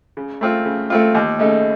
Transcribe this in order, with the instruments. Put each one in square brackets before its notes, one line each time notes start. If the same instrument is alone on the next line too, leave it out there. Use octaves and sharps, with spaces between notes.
[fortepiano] C#3
A3 C4 F4
C#3
A3 C4 F4
D#2
C#3 A3 D#4